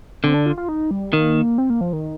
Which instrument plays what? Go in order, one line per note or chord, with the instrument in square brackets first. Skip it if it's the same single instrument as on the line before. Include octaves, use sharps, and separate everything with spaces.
[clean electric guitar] D3 [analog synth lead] C4
[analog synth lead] D4
F4
F4
D#4
G3
[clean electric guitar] D#3 [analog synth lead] A#3
[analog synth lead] C4
A#3
F3
D#3